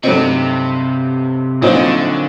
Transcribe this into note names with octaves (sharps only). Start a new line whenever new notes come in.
G2 C3 F#3 A3 C4 D#4
A#1 A#2 D3 F#3 C4 D#4